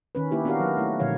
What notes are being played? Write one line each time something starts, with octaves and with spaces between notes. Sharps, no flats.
D#3 C#4 B4
A#3 E4 G4
B3 D4 F#4 G4 A#4 F5
F#3
A3 E4
A#2 D3 F3 C#5 F5